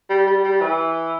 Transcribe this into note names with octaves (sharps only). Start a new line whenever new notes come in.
G3
G3
G3
E3